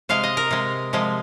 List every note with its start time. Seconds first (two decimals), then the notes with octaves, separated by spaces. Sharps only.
0.09 C3 G#3 F5
0.24 D#5
0.37 A#4
0.51 C3 G#3
0.93 C3 F3 G#3